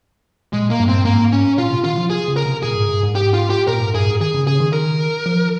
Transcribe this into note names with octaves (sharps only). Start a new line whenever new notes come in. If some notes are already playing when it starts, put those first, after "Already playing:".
A#2 G#3
A#3
G2
C4
G#2 A#3
C#4
A#2 F4
C3
D#3 F4
F3
G#4
C#3
A#4
C3
A#2 G#4
G#2
G2
G#2
G#2 G4
F4
G4
A#2 A#4
G#2
G2 G#4
G#2
D#3 G#4
C#3
C#3 G#4
D#3
A#4
F3